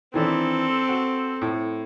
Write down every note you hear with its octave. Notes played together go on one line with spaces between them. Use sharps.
D#3 E3 C4 D4 A4
F#4
A2